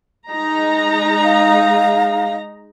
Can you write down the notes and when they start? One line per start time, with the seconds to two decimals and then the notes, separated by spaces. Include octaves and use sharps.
0.30 G#3 D#4 A#5
1.24 F5